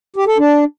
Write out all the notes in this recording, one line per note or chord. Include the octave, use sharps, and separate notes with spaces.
G4
A4
D4